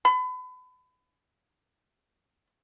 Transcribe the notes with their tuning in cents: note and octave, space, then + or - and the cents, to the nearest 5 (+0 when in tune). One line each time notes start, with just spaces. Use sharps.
B5 +35